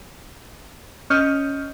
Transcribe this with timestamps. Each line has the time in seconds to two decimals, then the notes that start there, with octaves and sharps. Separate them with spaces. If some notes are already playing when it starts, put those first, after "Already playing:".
1.10 C#4 C#5 D#5 F6 G6